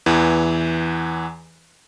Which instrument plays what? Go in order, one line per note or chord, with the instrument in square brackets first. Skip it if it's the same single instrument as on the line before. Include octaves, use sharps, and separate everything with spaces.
[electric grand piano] E2 E3